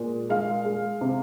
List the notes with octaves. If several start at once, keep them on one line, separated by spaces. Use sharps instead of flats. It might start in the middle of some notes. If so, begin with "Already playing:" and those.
Already playing: A#2 G#3
G#3 F5
G#3
C3